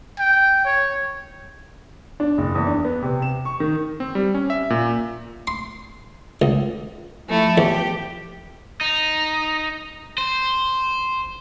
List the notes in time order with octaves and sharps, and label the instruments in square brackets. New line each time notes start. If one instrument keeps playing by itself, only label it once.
[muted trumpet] G5
C#5
[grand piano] D4
F#1
E2
D4
B3
C3
E7
C#6
D#3
[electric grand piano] C4
G3
C#4
E5
A#2
[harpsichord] C6
C#2
[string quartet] F3 A3 E4
[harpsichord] E2 [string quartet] G4
[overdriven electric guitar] D#4
C5